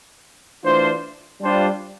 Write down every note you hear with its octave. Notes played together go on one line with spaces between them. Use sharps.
E3 A3 D4 F4 C5
G3 D4 F4 C5